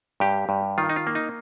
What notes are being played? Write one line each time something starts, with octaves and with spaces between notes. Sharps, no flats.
G2 G4
G2
D#3 F4
D#4
F4
A#3
D#4